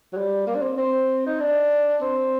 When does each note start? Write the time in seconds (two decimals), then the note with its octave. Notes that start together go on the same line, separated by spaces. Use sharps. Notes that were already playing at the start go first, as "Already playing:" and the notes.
0.13 F#3
0.17 G3
0.47 A#3
0.55 D4
0.62 C4
0.77 C4
1.26 D#4
1.40 D4
2.02 C4